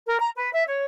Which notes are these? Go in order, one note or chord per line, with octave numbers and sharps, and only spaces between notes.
A#4
A#5
B4
E5
C#5